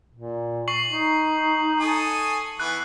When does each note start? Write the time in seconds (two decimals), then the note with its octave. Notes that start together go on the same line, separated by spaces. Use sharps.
0.15 A#2
0.68 C#6 C7 F#7
0.90 D#4
1.80 A4 G#5 D#6
2.60 E3 B3 F#6